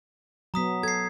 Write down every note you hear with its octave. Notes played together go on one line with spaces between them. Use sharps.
F#3 B3 A#5 D#6 B6
A4 G#6 C7